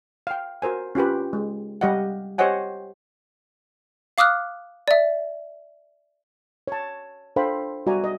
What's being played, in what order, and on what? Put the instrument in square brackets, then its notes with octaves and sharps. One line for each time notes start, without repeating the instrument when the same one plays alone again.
[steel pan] F5 G5
F#4 A#4 C5 G#5
C#4 F4 G4 B4
G#3
G3 G4 D#5 F5 F#5
G4 C5 C#5 D#5 F#5 G#5
[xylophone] F5 D6 D#6 F6 F#6
D5 E5
[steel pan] C#5 A5
D4 A4 C5 F5 G5 B5
G3 F#4 D5 E5 G#5 A#5
D#5